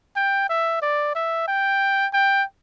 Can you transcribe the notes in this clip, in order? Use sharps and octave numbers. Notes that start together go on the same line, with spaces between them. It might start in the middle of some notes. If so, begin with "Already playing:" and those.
G5
E5
D5
E5
G5
G5